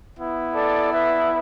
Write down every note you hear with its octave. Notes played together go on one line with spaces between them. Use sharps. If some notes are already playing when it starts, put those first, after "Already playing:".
B3 E4
A4 D5
B4 E5